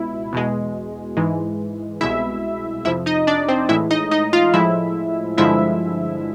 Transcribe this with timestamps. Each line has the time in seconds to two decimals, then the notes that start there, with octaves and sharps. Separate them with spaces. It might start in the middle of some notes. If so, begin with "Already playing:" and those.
Already playing: C#2 B2 E4
0.33 E2 B2 G#3
1.17 G#2 E3 G#3
2.01 C2 B2 G#3 E4 E5
2.85 F2 C3 F3 E4 E5
3.06 D#4 D#5
3.27 D4 D5
3.48 C4 C5
3.69 A2 E3 G#3 E4 E5
3.91 D#4 D#5
4.11 D#4 D#5
4.33 F4 F5
4.54 A2 F3 G#3 E4 E5
5.38 G2 D3 F3 G#3 E4 E5